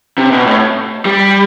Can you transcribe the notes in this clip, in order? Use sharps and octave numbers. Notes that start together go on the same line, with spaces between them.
C3
B2
A2
G3